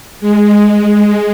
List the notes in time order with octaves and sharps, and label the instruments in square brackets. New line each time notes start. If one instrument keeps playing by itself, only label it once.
[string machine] G#3